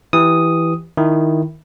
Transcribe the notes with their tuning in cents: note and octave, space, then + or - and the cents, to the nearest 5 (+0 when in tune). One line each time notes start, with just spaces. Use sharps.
E3 +0 G4 +0 D#6 +0
D#3 +0 E4 +0